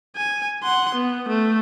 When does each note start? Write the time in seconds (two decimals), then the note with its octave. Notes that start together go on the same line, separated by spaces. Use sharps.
0.17 G#5
0.63 F#5 C6
0.95 B3
1.28 A3